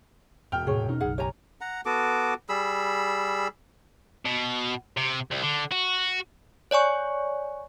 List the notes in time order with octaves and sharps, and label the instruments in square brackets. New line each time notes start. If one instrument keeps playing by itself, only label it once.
[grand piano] E1 G5 F6
[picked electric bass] A2 C3 [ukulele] G#4 C#5
[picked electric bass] B2 C#4 [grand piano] D#4
[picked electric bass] F#1 B1 [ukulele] G#4 F#5
[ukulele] G4 G#5 A#5 [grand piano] C#5
[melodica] F#5 A#5
B3 F#4 A4 D6
G3 G#4 B5 E6
[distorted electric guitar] B2
C3
C2
D3
F#4
[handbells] C#5 D5 G#5 C#6